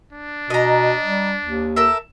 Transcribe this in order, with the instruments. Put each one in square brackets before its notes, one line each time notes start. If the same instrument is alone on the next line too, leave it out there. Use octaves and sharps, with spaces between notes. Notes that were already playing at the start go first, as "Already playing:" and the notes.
[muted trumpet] D4
[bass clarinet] B2 [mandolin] D#5 A#5
[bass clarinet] G3
D#2
[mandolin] A4 A#4 E5